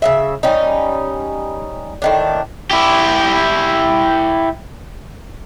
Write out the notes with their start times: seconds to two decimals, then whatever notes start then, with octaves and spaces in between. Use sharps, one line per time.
0.02 C#3 G#3 E5
0.43 G3 C#4 D#4
2.02 A2 D#3 D4
2.71 E4 G4